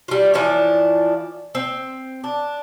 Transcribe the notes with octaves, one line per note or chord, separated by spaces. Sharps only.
G3 F4
E3 F3 D4 C#5
C4
D4